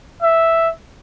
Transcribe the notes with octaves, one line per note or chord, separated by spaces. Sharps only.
E5